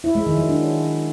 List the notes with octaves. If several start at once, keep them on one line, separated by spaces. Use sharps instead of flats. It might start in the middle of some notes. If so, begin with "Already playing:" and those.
E4
G#3
D#3
F#3
D4